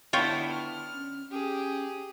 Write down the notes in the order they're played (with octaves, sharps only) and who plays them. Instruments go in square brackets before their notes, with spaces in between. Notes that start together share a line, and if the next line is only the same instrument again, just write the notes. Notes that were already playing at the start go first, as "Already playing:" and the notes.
[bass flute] D3 [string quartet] B3 D4 E4 [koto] F4 C#5 G5
[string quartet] F6
[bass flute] C#4
[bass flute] C#4 [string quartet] G4 G#4